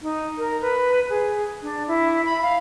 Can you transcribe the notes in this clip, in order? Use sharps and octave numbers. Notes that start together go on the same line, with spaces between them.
D#4
A#4
B4
G#4
D4
E4
B5
F5